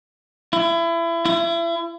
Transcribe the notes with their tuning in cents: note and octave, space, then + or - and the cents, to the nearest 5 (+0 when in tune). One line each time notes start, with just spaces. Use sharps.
E4 +30
E4 +35